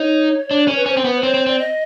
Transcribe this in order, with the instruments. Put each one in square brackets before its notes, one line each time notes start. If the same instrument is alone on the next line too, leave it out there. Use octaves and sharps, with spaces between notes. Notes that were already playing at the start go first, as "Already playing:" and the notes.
Already playing: [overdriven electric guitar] D#4 [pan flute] C#5
[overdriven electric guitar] D4
C#4
[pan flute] B4
[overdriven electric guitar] C#4 [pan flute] C5
[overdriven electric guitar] C4
B3
[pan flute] C5
[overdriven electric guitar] C4 [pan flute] C#5
[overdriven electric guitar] C4
[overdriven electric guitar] C4 [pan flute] D5
[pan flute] D#5